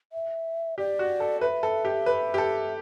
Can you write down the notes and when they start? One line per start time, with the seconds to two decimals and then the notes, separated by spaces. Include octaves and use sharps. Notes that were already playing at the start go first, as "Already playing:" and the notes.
0.13 E5
0.78 G4 D5
0.99 F#4
1.20 A4
1.41 B4 E5
1.63 A4
1.85 G4
2.06 B4
2.34 G4
2.38 A4